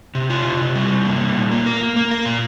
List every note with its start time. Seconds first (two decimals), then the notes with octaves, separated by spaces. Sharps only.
0.15 C3
0.30 F4
0.45 C3
0.61 C3
0.75 G3
0.90 C3
1.05 A#3
1.21 G3
1.36 A#2
1.52 A#3
1.66 A#4
1.81 A#3
1.96 A#3
2.11 A#4
2.26 A#2